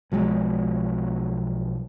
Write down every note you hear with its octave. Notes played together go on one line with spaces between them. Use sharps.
B1 F3 F#3 G#3